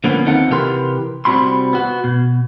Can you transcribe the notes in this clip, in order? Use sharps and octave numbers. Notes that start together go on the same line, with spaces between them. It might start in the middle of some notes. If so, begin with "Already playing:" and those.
D3 F3 A#3 B3 C#4
D#2 C4 D#4 F4 A4 F#5
C3 E3 G4 A#4 B4 C6
C2 G3 C4 F#4 B5 C6
B3 F#4
B2